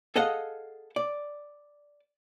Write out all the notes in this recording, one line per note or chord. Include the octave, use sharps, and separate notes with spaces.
G#4 A4 D#5 F5 F#5
D5